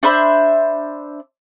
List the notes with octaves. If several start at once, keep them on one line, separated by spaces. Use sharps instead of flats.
D4 C5 E5 B5